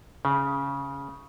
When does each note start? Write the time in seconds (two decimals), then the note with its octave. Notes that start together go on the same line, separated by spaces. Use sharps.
0.25 C#3